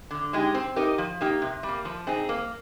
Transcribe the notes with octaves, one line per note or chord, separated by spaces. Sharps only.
D3
G#3 D#4 G4
C4
D#4 G4 A#4 D#5
F3
A#3 D#4 G4
C3
G3
A#3
F3
C4 D#4 G#4
A#3